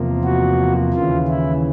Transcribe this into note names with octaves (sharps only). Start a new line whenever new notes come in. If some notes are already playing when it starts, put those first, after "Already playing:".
Already playing: E2 C3 F3 A#3
F#4
D#2 C#3 E3 F4
E4